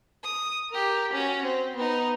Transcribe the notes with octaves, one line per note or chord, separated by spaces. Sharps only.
D#6
G4 A#4
C#4 F#4
C4
B3 D#4